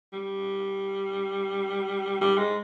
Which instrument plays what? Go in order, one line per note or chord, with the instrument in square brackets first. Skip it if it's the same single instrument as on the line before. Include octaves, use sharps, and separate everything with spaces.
[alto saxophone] G3
G3
G#3